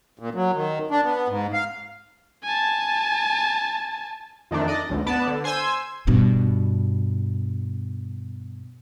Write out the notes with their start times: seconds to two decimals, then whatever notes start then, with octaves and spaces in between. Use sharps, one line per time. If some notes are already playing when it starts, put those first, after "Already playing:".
0.19 A#2
0.35 F#3
0.54 D#3
0.91 D4
1.04 B3
1.28 G#2
1.53 F5
2.44 G#5 A5
4.51 F2 D#3 A3 D4
4.68 D5 D#5
4.89 G#1 D2
5.06 B3 D5 A5
5.27 D3
5.44 C5 G#5 C6 E6 G#6
6.07 G2 B2